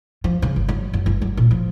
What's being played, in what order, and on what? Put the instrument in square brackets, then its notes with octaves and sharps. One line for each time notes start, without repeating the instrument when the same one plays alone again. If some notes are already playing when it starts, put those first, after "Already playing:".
[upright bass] F3
C#3
G1
F#3
F#2
G1
F#3
A#2
F3